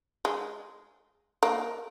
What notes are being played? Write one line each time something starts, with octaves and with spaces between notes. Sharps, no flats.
G#3
A#3